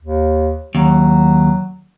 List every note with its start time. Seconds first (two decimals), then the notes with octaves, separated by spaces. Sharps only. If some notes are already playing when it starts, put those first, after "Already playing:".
0.03 D#2
0.75 D#2 F#3